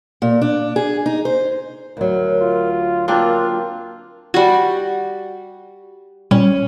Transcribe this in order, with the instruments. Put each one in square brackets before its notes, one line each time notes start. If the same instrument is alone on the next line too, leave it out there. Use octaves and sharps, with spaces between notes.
[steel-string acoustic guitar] A#2
D4
G#4
D#4
C5
[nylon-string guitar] D2 F#3 [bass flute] A#4
[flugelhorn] F4
[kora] A#3 C4 D4 [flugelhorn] F4 [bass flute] A#4
[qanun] G3 F#4
[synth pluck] A#2 G3 [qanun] C#4